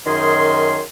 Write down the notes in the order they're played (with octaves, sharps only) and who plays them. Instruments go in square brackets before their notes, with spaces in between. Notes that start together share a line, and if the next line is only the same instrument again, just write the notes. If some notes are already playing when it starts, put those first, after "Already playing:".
[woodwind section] F#2 D#3 G#4 C6